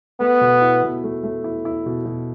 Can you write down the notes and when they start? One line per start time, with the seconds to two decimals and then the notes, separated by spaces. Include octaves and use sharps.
0.20 A3 B3
0.41 B2
0.62 E4
0.83 B2
1.04 A3
1.24 A3
1.44 E4
1.65 E4
1.86 B2
2.06 B2